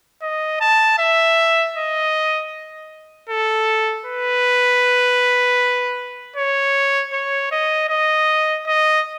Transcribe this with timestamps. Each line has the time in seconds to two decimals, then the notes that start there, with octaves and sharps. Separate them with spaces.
0.22 D#5
0.61 A5
0.99 E5
1.76 D#5
3.30 A4
4.06 B4
6.36 C#5
7.13 C#5
7.51 D#5
7.89 D#5
8.67 D#5